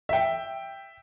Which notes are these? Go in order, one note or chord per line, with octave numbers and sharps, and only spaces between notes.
E5 G5